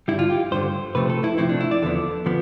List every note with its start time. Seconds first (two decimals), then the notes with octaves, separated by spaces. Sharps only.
0.08 G2 D3 G3 E4
0.19 F4
0.30 G4
0.51 G2 D3 G3 C5
0.95 C3 F3 A3 C4 B4
1.10 A4
1.24 E4
1.38 C3 F3 A3 C4 E4
1.49 D4
1.60 E4
1.71 D5
1.82 E2 D3 F3 B3 A4
2.26 D3 F3 B3